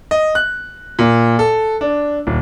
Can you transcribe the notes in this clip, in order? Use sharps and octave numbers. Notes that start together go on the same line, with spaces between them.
D#5
F#6
A#2
A4
D4
D#1